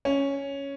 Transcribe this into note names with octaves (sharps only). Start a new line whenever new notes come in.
C#4